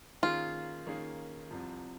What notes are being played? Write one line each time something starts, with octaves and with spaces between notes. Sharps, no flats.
D#3 A#3 C#4 F4 G#4
D#3 A#3 C#4 G#4
C2 C3 F3